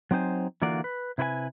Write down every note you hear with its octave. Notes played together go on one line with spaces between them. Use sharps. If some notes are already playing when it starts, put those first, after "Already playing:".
F#3 C4 D#4 C5 G#5
D3 E3 A#3 F4 F#4 D5
B4
C3 E4 B4 C5 G#5